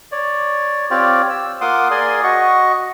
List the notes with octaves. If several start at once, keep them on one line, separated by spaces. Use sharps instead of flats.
C#5 D5
C4 F4 G4 C#5 D5
E6
A#3 F4 F#5 C6 D6 D#6
G#4 A#4 D5 G#5 C6 D#6
F#4 D#5 C#6